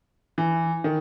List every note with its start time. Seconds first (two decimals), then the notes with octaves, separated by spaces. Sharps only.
0.38 E3
0.84 D#3